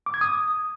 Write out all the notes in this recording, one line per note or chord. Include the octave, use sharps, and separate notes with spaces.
D6
G#6
D#6